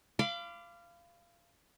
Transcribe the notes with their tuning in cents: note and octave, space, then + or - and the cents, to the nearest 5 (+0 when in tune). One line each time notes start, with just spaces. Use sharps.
F5 -20 B5 +35 D6 +0